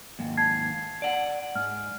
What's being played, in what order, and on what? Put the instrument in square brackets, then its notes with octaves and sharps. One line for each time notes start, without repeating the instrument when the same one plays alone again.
[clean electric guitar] D#2 G#2
[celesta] A5 G#6 C7
[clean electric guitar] D5 F#5
[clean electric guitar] G#2 [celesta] F6